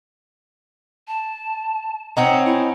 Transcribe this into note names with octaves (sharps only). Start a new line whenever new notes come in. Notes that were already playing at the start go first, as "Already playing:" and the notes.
A5
C4 C#4 D#4 F#5
E4